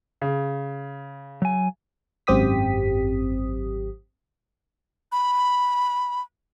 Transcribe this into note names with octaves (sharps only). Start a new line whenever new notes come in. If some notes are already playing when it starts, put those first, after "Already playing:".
C#3
F#3 G#5
G#1 F#2 C4 G4 D#6 B6
B5